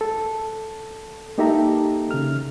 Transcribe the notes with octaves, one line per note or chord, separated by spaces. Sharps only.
A4
A#3 D#4 G4 A4 E5 A#5
C#3 F6